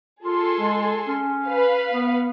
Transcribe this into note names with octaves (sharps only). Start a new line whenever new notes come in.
F4 G#4 A4 C6
G#3
C#4
B4 F5
B3